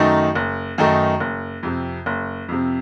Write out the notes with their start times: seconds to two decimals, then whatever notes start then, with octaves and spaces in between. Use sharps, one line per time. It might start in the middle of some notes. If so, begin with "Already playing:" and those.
Already playing: F#2 D#3 A3 D#4
0.35 F#1
0.78 F#2 D#3 A3 D#4
1.20 F#1
1.63 F2 C3
2.06 F#1
2.48 F2 C3